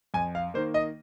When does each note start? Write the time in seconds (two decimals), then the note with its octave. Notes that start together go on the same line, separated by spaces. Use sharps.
0.14 F2 G#5
0.35 F5
0.54 D#3 A#3 C5
0.74 D#5